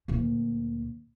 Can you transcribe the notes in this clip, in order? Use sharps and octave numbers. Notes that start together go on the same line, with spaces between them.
D2 A#2